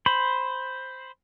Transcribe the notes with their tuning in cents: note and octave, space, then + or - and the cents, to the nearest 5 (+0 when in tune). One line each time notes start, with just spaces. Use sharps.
C5 +0 B5 +0